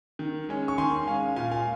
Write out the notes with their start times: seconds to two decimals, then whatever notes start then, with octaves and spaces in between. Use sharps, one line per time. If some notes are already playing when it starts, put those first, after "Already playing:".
0.19 D#3
0.49 G#3 C#4
0.68 C#6
0.78 D#3 G#5 C6
1.07 G#3 C#4 F5 G#5
1.36 A#2 F5 G#5
1.51 F5 G#5